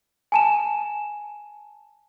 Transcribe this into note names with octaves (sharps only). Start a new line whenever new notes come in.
G#5 A5 E7